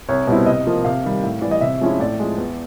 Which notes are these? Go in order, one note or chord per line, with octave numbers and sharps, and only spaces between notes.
C2 C#5
B2 G3 C4 E4
C3 D#5
F3 A#3
C3 F5
D#3 G3
A2
E3 G3 D5
D#5
C3 E5
F3 G#3 C#4 E4
A2 D5
F3 G#3
E2